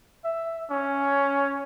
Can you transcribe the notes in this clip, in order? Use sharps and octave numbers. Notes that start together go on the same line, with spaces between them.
E5
C#4